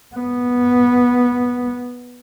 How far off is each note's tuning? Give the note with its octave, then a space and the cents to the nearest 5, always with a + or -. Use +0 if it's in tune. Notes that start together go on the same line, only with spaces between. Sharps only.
B3 -10